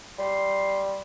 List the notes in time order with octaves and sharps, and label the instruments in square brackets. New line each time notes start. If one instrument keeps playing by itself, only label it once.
[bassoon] G3 [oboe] C6